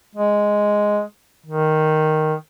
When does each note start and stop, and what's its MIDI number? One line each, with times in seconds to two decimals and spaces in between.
0.15 1.02 56
1.46 2.34 51